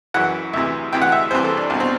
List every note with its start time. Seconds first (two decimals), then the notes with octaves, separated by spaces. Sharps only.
0.14 F#2 E3 F#5
0.53 D2 C3 E3 E5
0.92 D2 C3 E3 G5
1.02 F#5
1.12 E5
1.31 C2 C3 E3 C5
1.44 A4
1.57 D4
1.70 C2 B2 D4
1.80 C4